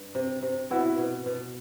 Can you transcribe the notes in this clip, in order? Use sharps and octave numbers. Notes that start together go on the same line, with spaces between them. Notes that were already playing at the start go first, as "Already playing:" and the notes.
Already playing: G2
C3
C3
B2 E4 F#4
B2
B2